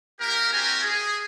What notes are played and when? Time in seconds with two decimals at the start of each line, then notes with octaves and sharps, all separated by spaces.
0.20 A#3 E4 G4 A#4
0.52 C4 E4 F#4 G4 A#4 G#5
0.84 G#4